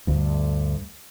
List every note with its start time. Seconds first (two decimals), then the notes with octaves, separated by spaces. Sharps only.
0.07 D2 G2